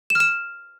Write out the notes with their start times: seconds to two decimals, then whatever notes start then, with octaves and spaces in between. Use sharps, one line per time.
0.10 E7
0.15 F6
0.20 E7